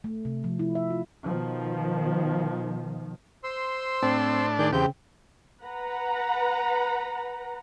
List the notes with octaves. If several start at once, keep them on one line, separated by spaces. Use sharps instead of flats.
A3
C3
F3
E4
E5
F4
B2 D#3 F3
C5 C6 E6
A2 C4 D4 A5
D#3 G#4 D5 G6
E2 C#3 C4 G4 G5 G6
B4 F#5 A#5